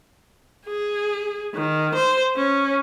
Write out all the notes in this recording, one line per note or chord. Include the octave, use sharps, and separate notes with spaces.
G#4
D#3
C5
C#4